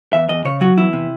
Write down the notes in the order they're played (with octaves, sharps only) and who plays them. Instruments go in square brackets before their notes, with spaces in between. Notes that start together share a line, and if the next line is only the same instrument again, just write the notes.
[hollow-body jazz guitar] E2 E5
E2 D#5
C#3 C#5
F#3 F#4
E2 E4
C3